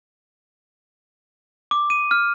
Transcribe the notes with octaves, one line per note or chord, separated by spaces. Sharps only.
D6
D#7
F6